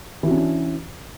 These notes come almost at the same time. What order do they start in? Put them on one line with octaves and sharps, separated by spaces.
E3 F#4 C#4 D4